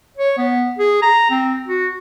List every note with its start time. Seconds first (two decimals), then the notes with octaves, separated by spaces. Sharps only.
0.17 C#5
0.38 B3
0.79 G#4
1.02 A#5
1.31 C4
1.67 F#4